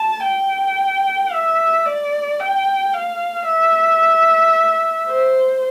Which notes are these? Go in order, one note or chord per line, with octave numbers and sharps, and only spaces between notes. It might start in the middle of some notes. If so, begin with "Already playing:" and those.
Already playing: A5
G5
E5
D5
G5
F5
E5
C5